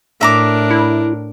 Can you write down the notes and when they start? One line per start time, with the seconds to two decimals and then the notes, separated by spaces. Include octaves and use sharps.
0.21 A2 D4 A#4 E5 A#5 D6
0.71 E4